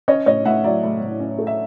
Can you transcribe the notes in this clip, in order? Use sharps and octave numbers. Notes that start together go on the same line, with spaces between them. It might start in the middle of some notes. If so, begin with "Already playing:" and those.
C#4 C#5 D#5
A2 C#5 D#5
A2 E5 F#5
F#3 D5 E5
A2
A2
C#4
A3
E5